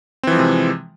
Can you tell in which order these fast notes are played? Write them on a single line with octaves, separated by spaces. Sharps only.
C4 E3 F3 G#3 C3